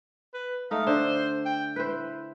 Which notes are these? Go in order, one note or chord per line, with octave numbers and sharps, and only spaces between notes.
B4
A3 D#4 F5
D3 C5
G5
E4 B4 C5